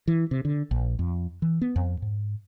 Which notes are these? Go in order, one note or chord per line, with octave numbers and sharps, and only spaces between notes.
E3
C3
D3
A#1
F2
E3
B3
F2
G#2